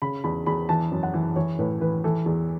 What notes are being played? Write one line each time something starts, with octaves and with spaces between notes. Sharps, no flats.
C#3 B5
E2 B5
E2 B5
E3 A5
F#2
F#5
E3
E3 C#5
A2 B4
E3 B4
E3 A4
E2